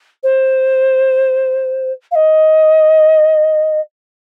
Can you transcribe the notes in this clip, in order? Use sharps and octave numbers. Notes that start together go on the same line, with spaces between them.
C5
F5
D#5